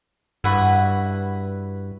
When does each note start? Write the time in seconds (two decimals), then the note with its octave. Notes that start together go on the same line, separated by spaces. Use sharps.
0.44 G2 E4 F#4 B4